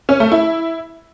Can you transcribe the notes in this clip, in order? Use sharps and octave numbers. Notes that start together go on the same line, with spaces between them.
C#4
A3
E4